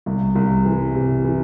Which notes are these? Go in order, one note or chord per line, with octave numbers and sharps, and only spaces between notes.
C2
C2
E3
C3
E3